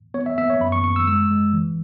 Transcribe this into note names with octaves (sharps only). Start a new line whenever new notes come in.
B3 C#5
E5
B3 E5
C#5
F#2 B5
C#6
F#2 C#6
E6
G#3 E6
G#3
E3